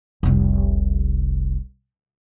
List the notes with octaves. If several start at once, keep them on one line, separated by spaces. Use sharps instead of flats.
F1 C2